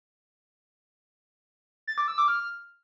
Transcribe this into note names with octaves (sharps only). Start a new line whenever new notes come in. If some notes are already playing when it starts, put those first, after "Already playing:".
A6
D6
E6
D6
F6